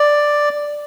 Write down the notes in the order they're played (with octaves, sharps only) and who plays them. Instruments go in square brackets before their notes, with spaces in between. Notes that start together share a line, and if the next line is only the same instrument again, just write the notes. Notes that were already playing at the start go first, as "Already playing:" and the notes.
Already playing: [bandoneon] D5